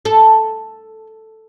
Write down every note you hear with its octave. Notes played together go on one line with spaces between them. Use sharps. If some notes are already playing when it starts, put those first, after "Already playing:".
A4